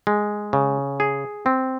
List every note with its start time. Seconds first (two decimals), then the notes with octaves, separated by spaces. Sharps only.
0.07 G#3
0.53 C#3
1.00 G#4
1.46 C4